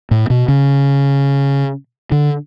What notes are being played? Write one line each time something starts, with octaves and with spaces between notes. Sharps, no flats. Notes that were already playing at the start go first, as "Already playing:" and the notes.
A2
B2
C#3
D3